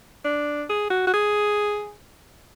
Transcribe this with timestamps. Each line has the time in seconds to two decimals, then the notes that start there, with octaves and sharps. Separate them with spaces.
0.25 D4
0.69 G#4
0.90 F#4
1.07 F#4
1.13 G#4